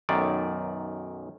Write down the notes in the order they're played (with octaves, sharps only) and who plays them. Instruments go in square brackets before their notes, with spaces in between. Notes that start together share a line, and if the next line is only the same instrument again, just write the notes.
[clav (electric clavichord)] B1 F#2 D#3 D5